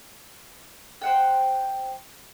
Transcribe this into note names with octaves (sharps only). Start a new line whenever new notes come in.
C5 F#5 G5